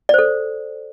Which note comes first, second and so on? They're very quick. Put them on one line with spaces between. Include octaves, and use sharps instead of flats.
D5 C5 A4